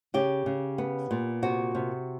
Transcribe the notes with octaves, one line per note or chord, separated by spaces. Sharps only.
C#3 G4
C#3
B3
A#2
C3 F#4
C3